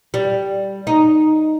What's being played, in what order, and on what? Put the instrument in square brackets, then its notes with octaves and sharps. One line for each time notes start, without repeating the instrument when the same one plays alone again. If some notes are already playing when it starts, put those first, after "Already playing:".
[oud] G3
D#4